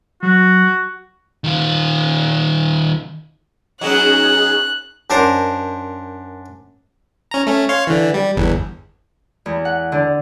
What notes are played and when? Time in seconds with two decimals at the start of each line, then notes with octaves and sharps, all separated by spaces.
0.23 F#3 F#4
1.44 D#3 F4
3.81 F#3 B3 C#4 D#4 G#4 F#6
5.10 F#2 D4 A#4 C5 A#5
7.31 C#4 A#5
7.47 A3 C#4
7.69 C#5 F5 C6
7.87 D3 E3
8.14 G3
8.36 G1 E2
9.46 E2
9.65 F#5
9.92 D3